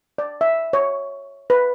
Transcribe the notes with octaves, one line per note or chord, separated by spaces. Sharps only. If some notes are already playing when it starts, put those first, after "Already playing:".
D5
E5
C#5
B4